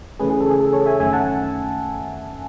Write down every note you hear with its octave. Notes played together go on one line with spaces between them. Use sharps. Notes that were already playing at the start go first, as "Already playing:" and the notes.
C#3 E3 A3 C#4 G#4 B4
G#4
A4
G#4
A4
A4 C#5
E5 G#5
F#2 D#3 A3 C#4 E5 G#5
F#5 A5